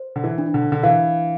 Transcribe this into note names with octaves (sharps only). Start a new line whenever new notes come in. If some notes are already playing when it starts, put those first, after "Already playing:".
Already playing: C5
D3
E3
D4
D3
D3
E3 F5